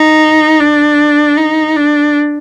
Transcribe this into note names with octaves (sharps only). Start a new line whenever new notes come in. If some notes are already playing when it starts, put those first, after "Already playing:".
Already playing: D#4
D4
D#4
D4